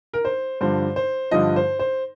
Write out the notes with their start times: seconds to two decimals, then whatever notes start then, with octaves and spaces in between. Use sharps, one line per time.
0.13 A#4
0.25 C5
0.61 G2 D3 F3 C5
0.96 C5
1.31 G2 D3 F3 D#5
1.56 C5
1.79 C5